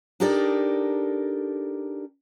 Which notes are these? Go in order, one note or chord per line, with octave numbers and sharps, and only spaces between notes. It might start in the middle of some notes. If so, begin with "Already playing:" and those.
D4 D#4 G4 A4 A#4 D5